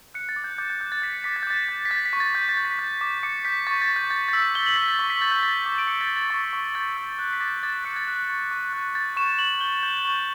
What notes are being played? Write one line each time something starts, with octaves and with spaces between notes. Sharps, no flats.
F#6 C#7
A6
D6
G6
D6 G6
G6
F#6 G6
A6
G6 B6
C#7
D6 B6
A6
G6
D6 A6
G6
B6
G6 A6
B6
C#6
A6
C#6 G6
A6
G6
B6
G6
D6
D6 C#7
G6 B6
C#6 A6
A6
C#6
G6
G6 A6
A6
E6 B6
G6 G7
F#7
C#6 B6
A6
C#6
B6
G6 A6
G6
G6 A6
D6 B6
D7
D6 C#7
A6
G6
A6
C#6 A6
C#6
G6 A6
E6
F#6 G6
B6
D6 A6
B6
D6 A6
B6
F#6 C#7
A6
F#6
C#6
C#6
F#6
G6 A6
C#6 E7
C#6 F#7
G6 G7
G6
C#6